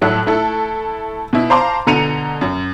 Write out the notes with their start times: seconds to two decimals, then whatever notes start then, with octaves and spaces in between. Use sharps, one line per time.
0.02 A2 F#3 E4 A4 F#6
0.26 A3 E4 A4
1.33 B2 E4
1.50 C5 F5 A5 A#5 C6 D6
1.87 B2 D3 A#5 C#7 D#7 F7
2.41 F#2